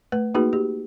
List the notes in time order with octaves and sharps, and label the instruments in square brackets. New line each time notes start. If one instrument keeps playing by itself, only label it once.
[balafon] A3 B4
A#3 D#4 F#4 G#4 B4
G4